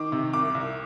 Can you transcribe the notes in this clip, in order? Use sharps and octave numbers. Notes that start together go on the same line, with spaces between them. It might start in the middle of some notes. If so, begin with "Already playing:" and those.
Already playing: D#3 D6
C3
C2 D6
C2